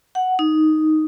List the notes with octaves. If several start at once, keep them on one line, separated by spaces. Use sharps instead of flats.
F#5
D#4